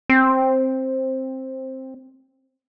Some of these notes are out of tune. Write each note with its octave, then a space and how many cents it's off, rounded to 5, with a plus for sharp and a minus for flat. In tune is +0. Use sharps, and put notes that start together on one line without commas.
C4 +10